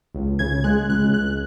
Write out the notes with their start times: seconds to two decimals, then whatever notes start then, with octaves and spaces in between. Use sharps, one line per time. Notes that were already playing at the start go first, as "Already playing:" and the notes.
0.15 C#2
0.39 C#3 G#6
0.64 G#3 F#6
0.89 C#2 F#6
1.14 C#2 F#6